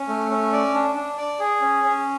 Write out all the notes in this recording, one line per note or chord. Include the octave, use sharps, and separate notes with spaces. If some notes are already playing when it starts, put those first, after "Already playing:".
Already playing: C#4
A3
C#4
D5
D4
D4
D5
G#4
C#4
C#4